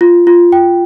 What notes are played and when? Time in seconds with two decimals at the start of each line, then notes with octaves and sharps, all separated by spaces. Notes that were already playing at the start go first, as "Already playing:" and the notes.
0.01 F4
0.27 F4
0.52 G5